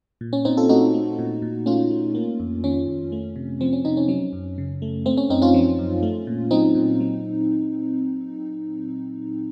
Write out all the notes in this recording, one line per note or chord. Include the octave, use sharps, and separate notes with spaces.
A#2
C#4
A#2 C4 D#4
F4 A4
A3 D#4 F#4
A3
A#2
A#2
A3 C#4 F4
A3
A#3
F2
D#3 C#4
F2
A3
C3
F3 C4
C#4
C3 C4 D#4
C#4
F#3 C#4
F#2
C#3
A3
A3 C4
C#4
F#2 C4 D#4
C#4 F4
F3
F#2
A3
A#2
F#3 C4 D#4
A#2
F#3